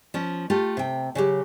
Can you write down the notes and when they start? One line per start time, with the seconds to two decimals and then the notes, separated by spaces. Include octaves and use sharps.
0.14 F3 C#4
0.50 A3 F4 G4
0.77 C3 G5
1.15 C#3 F#3 G4